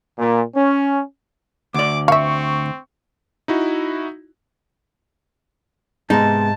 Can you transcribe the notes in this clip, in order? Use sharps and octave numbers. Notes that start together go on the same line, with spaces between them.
A#2
C#4
D2 D5 D6
C4 E5 F5 C#6
D#4 E4 F#4
G#2 C3 G#3 B3 D#4 A5